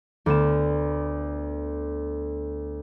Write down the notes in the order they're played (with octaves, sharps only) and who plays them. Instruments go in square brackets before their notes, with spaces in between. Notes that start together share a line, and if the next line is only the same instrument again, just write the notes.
[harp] D2 B3 E7